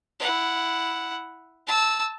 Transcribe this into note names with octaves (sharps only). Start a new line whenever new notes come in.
E4 F#5
A5 E6